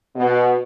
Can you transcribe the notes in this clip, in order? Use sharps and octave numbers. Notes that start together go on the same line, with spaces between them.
B2